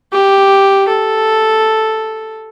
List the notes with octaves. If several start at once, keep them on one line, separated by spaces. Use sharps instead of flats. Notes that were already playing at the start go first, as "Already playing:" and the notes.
G4
A4